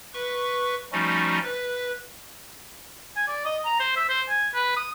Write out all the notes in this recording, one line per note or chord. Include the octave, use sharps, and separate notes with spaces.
B4 C#6
F3 G3 A3 C#4 D#4 F#4
B4
G#5
D5
D#5
A#5
C5
E5
C5
G#5
B4
D#6